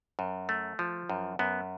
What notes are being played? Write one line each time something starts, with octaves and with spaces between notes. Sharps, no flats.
F#2
A3
F3
F#2
F#2 B3